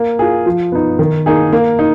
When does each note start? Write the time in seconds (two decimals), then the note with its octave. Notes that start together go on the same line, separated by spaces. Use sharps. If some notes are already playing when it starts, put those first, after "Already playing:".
Already playing: A#3
0.19 F4 G#4
0.46 F3
0.72 B3 D#4
0.99 D#3
1.26 A#3 D#4 G#4
1.53 A#3
1.79 D#4